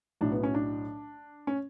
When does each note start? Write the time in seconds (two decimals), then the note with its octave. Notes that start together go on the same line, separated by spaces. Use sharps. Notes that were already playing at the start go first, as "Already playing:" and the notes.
0.21 B1 A2 F#3 D4
0.32 B3
0.43 C#4
0.54 D4
1.47 C#4